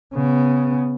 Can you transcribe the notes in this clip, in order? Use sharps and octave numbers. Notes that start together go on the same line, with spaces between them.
C#3 B3